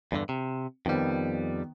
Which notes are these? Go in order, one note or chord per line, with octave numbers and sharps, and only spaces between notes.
E2 G2 D3
C3
F2 D#3 G3 B3 C5